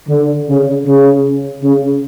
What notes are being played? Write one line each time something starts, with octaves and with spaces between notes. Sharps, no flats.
D3
C#3
C#3
C#3